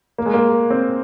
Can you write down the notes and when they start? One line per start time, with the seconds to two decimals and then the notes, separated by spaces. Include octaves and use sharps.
0.18 A#3
0.26 G#3
0.34 A#3
0.70 C4